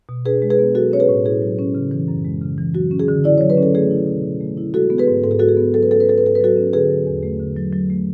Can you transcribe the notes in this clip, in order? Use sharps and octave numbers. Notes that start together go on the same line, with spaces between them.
B2
D4 G#4 B4
G#3
G#4 B4
B3
F#3 F#4 A4
C#4 C#5
G#4 B4
A2
E4 G#4
F#3
C#4
C#3
E3
F#2
G#3
C#3
E3
F#3 F#4
C#4
G#4
D3
E4 D5
F#3 C#5
B4
C#4
A4
A3 G#4
E4
B2
B2
A3
E4
G#3 F#4 A4
B3
G#4 B4
G#2
G#2 A4
G#4
G#3 F#4 A4
G#4
B3
F#3 A4
B4
C#4 A4
B4
G#2 A4
B4
G#2 A4
B4
F#3 F#4 A4
C#4
D3 G#4 B4
F#3
E2
A3
D3
F#3
F#3
A3